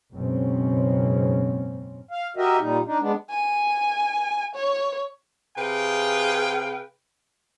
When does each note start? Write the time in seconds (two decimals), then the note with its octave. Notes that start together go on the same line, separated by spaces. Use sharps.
0.12 F#1 G#2 B2 C4 C#4
2.11 F5
2.37 F#4 G4 A#4 D#5 E5
2.58 A#2 G3 D#4
2.85 D4 D#4
3.00 G#3 B3 D4
3.30 G#5
4.55 C#5
5.57 C3 G#4 B4 F5 G5